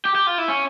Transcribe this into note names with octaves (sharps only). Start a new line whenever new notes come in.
G4
G4
F4
E4
C#4